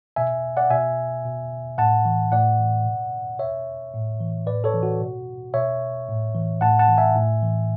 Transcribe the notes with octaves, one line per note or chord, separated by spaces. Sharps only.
B2 E5 G#5
D5 F#5
B2 E5 G#5
B2
A2 F#5 A5
E3
A2 D5 F#5
E3
B2
B2 C#5 E5
A2
E3
A2 B4 D5
A4 C#5
E3
F#4
B2
B2 C#5 E5
A2
E3
A2 F#5 A5
F#5 A5
E3
E5 G#5
A2
E3